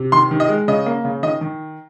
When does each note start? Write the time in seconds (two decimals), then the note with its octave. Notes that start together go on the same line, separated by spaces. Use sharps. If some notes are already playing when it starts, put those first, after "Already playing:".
Already playing: C3
0.12 D#3 C6
0.31 D#3
0.40 D#5
0.48 G#3
0.68 C#3 D#5
0.86 A#3
1.05 C#3
1.23 D#3 D#5
1.41 D#3